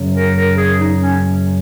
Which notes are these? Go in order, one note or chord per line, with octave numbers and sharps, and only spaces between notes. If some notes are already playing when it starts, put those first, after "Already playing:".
Already playing: F#2 C#3 F#3
A#4
A#4
G#4
D#4
C#4